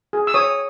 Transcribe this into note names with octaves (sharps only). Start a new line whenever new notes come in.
G#4
E6
C#5 D#6